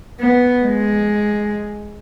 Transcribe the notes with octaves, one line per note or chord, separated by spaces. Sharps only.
B3
G#3